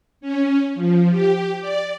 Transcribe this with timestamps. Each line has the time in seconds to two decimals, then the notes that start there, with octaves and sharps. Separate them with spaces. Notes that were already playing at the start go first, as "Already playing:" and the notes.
0.21 C#4
0.75 F3
1.10 G4
1.60 D5